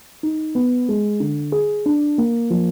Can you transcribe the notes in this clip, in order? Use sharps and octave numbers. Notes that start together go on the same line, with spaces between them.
D#4
B3
G#3
D3
G#4
D4
A#3
F3